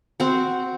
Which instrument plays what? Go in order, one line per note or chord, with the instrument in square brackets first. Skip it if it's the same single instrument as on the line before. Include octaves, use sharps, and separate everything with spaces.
[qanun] C4 F#4 C5